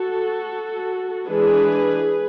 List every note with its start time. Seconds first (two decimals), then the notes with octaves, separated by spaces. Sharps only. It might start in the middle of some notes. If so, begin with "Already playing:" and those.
Already playing: F#4 A4
1.27 E3 G#3 D4 G#4 B4